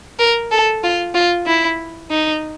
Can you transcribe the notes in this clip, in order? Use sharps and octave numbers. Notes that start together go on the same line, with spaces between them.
A#4
A4
F4
F4
E4
D#4